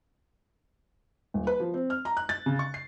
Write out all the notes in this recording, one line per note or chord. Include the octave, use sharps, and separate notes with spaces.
D#1
B4
F3
C4
F6
A#5
F#6
A6
C#3
C#6
C7